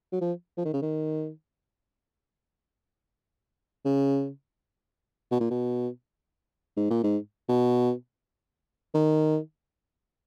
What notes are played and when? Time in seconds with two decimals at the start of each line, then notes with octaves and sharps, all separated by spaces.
0.12 F#3
0.21 F3
0.57 F3
0.65 D#3
0.73 C#3
0.82 D#3
3.85 C#3
5.31 B2
5.40 A#2
5.50 B2
6.77 G#2
6.90 A#2
7.04 G#2
7.49 B2
8.94 D#3